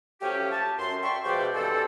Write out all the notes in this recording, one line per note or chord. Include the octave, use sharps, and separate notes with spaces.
F3 F#3 A3 C#4 G4
A5
F#2 C6
D5 E5 G5 C6 C#6
B2 F3 G#3 D5 G5
G2 E3 G3 C4 A4